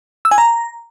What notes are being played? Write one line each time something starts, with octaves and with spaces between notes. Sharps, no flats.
E6
G#5
A#5